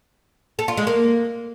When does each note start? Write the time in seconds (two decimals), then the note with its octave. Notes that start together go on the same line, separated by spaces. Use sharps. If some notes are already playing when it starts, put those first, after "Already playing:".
0.59 A4
0.68 F4
0.77 G#3
0.87 A#3